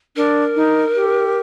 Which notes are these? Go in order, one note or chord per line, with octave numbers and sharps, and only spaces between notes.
D4 A#4
D#4
G4